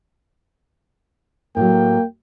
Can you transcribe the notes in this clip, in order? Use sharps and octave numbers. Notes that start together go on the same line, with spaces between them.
A2 F#3 A#3 G5